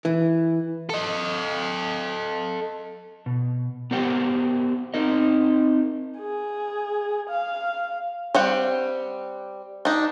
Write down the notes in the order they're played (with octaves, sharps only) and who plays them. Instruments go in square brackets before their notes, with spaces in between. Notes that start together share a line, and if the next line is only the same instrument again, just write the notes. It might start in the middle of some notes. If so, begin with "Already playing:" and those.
[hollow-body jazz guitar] E3
[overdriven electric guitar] A4 D#5
[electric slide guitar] B2
B3 G4 A#4 C5 F#5 G5
C4 D#4 A#4 D#5
[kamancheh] G#4
F5
[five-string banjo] G3 C4 F#5
D4 D#4